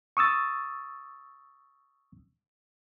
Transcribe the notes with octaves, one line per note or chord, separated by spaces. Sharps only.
C#6 D#6 E6 A6